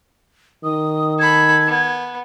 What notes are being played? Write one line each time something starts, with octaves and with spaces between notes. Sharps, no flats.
D#3 D#6
A4 B5 G#6
B3